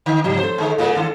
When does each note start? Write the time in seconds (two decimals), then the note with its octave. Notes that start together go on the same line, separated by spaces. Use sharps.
0.06 D3
0.24 G#2 C#3 F3 G3
0.39 A4 C5 C#5
0.58 D3 G#3
0.78 C#3 G#3 A#3 F4 G#4
0.96 D#3 D4 A4